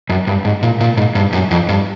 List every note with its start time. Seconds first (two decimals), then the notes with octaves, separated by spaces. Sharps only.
0.10 F#2
0.27 G2
0.45 G#2
0.63 A#2
0.81 A#2
0.97 G#2
1.15 G2
1.33 F#2
1.51 F2
1.69 G2